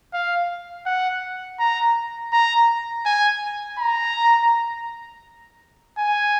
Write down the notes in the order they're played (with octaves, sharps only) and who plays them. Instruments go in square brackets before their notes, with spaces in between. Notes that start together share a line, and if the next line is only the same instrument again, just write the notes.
[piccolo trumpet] F5
F#5
A#5
A#5
G#5
A#5
G#5